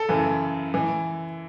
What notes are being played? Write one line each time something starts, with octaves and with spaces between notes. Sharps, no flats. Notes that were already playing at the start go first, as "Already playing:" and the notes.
Already playing: A4
F#2 C#3 E3
E3